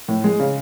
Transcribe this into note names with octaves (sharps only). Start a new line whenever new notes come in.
A2
G#3
C#3